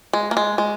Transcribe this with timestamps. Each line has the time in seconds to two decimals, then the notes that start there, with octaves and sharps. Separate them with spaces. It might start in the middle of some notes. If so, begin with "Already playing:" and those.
0.13 G#3
0.31 A#3
0.37 G#3
0.58 G#3